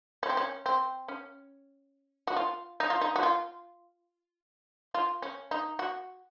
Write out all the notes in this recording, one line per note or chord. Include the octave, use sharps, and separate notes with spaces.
C#4
C4
C#4
C4
C#4
F#4
F4
D#4
F4
D#4
F#4
F4
F4
C#4
D#4
F#4